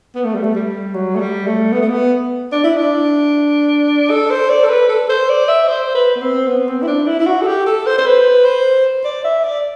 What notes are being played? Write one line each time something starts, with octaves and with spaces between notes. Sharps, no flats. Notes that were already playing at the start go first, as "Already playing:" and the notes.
B3
A3
G3
A3
G3
F#3
A3
G3
A3
B3
A3
B3
D4
E4
D4
A4
C5
D5
A4
B4
A4
C5
D5
E5
C5
B4
B3
C4
B3
C4
E4
D4
E4
E4
F#4
A4
G4
A4
C5
C5
B4
C5
D5
E5
D5